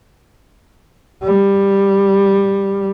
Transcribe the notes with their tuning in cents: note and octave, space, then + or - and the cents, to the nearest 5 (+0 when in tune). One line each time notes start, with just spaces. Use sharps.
G3 +10